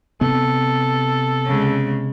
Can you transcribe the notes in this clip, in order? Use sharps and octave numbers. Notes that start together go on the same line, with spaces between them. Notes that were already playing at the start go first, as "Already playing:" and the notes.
C3 B3 A4
C#3 G#3